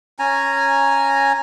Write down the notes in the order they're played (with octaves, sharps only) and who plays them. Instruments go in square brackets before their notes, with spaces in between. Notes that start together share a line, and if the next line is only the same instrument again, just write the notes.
[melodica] C#4 G#5 A#5